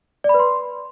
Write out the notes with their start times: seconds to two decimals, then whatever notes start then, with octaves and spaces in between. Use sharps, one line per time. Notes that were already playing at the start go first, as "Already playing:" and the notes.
0.24 D5
0.29 B5
0.34 B4
0.39 C6